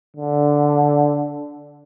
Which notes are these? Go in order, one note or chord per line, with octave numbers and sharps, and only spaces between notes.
D3